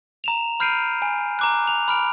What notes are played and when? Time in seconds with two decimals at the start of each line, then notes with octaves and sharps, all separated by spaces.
0.24 A#5 E7 F7
0.60 B5 F6 G6 C7 D7 D#7
1.02 G#5
1.39 A#5 D6 F#6
1.67 F7
1.88 B5 F6 D7